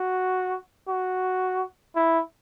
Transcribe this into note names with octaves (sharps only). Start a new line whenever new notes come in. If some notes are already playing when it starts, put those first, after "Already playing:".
Already playing: F#4
F#4
E4